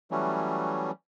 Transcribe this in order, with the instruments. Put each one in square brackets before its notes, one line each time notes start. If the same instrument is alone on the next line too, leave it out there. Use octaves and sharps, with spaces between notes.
[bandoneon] E3 F#3 G3 A3 C#4